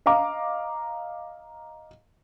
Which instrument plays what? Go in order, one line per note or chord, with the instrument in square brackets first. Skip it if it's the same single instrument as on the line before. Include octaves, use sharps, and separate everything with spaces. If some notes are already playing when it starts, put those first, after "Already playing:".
[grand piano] D#5 F5 A#5 D6